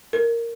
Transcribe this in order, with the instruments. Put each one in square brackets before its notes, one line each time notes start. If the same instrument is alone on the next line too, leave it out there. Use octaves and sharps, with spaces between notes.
[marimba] A#4